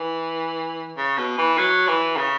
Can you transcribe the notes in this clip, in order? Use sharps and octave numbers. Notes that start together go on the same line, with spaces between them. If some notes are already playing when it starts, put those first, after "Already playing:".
Already playing: E3
C#3
B2
E3
F#3
E3
C#3